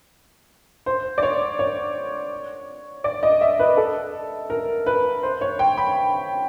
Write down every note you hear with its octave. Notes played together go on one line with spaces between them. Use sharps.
C5
D5
C#5
C#5
D5
D#5
E5
B4
A4
A#4
B4
C5
C#5
G5
B5